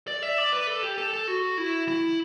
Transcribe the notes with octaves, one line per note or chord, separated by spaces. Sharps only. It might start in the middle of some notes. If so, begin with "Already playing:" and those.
D5
E5
D5
B4
A4
G4
A4
A4
F#4
E4
E4